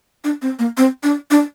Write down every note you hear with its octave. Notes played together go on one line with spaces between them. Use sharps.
D4
C4
A#3
C4
D4
D4